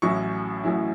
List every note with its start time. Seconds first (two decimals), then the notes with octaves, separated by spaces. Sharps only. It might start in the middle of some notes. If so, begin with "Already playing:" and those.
0.02 A1 A2 F#3 C#4 E4 C#6
0.64 A1 A2 F#3 C#4 E4